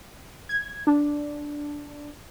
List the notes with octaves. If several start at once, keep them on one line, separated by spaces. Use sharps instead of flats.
G#6
D4